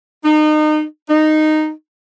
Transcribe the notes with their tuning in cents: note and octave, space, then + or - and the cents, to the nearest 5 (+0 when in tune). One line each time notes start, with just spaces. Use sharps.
D#4 -30
D#4 -10